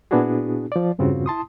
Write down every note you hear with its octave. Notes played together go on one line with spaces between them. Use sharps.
A#2 B3 D4 E4 F#4 G#4
F3 D5
E2 G2 C#3 C4 F4 F#4
E4 A5 C6 D#6